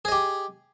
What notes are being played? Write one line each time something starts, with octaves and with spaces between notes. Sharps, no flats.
G4 G#4 D#5